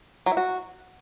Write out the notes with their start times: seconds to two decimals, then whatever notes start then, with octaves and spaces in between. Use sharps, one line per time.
0.26 F#3
0.32 E4
0.37 F#4